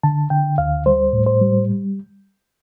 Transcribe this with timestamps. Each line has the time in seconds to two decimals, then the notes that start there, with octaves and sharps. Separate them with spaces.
0.03 D3 A5
0.30 D3 G5
0.58 D2 F5
0.86 G3 C5
1.13 A2
1.26 C5
1.41 G3